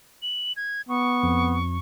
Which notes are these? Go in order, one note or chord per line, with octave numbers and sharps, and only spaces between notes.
F#7
G#6
B3 C#6
F2